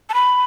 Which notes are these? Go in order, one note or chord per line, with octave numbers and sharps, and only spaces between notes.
A5
B5